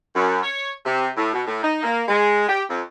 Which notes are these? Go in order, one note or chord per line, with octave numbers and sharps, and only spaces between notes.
F#2
C#5
C3
A2
B2
A2
D#4
A#3
G#3
G4
F2